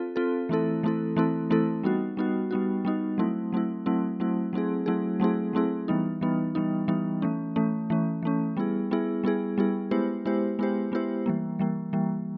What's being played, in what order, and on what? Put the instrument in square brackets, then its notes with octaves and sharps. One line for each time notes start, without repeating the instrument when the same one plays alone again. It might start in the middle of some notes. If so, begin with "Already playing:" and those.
Already playing: [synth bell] C4 F4 A4
C4 F4 A4
E3 A3 C4 E4 A4
E3 A3 C4 E4 A4
E3 A3 C4 E4 A4
E3 A3 C4 E4 A4
G3 B3 D#4 F#4
G3 B3 D#4 F#4
G3 B3 D#4 F#4
G3 B3 D#4 F#4
F#3 A3 C4 E4
F#3 A3 C4 E4
F#3 A3 C4 E4
F#3 A3 C4 E4
F#3 A3 C4 E4 G#4
F#3 A3 C4 E4 G#4
F#3 A3 C4 E4 G#4
F#3 A3 C4 E4 G#4
E3 G3 B3 D#4
E3 G3 B3 D#4
E3 G3 B3 D#4
E3 G3 B3 D#4
E3 A3 C#4
E3 A3 C#4
E3 A3 C#4
E3 A3 C#4
G3 B3 E4 G#4
G3 B3 E4 G#4
G3 B3 E4 G#4
G3 B3 E4 G#4
G#3 B3 E4 G4 C5
G#3 B3 E4 G4 C5
G#3 B3 E4 G4 C5
G#3 B3 E4 G4 C5
E3 G3 A#3
E3 G3 A#3
E3 G3 A#3